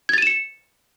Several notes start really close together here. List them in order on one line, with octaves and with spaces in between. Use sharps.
G#6 A6 D#7 E7 C#7